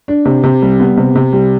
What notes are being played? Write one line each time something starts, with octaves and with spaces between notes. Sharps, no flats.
D4
C3
C3
G3
B3
C3
C3
G3